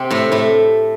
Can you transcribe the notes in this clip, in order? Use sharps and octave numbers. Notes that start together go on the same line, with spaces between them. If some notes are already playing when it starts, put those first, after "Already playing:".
Already playing: C3 C4
A2 A3
A2 A3